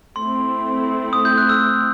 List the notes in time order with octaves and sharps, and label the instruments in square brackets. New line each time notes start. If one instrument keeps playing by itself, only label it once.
[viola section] A3 C4 E4 [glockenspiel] C6
[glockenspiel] D#6
G6
F#6
E6